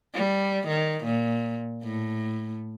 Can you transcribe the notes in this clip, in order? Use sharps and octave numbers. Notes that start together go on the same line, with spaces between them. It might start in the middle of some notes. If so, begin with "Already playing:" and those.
G3
D#3
A#2
A2